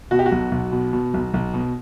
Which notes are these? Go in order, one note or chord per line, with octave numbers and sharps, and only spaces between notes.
B2 F#4
G4
F#4
B1
B1
B2
B2
B1
B1
B2